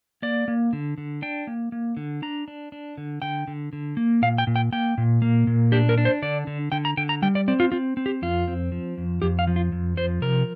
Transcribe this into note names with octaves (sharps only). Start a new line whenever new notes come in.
A#3 D5
A#3
D3
D3
D4 G5
A#3
A#3
D3
D4 A#5
D4
D4
D3
D3 G5
D3
D3
A#3
A#2 F5
G5
A#2
G5
A#3 G5
A#2
A#3
A#2
D4 G4
A#4
D4
C5
D3 D5
D3
D3 G5
A#5
D3 G5
A#5
G3 G5
D5
C4 D5
F4
C4 F4
C4
G4
F2 F4
C4
F3
F2
F2 G4
F5
F3
F4
F2
F3 C5
C3 A#4